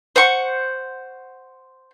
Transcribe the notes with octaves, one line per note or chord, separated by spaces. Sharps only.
C5 F#5 C#6